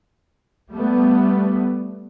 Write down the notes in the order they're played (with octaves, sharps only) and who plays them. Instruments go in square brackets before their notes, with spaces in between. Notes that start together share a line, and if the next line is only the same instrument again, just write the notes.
[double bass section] G3 A3 B3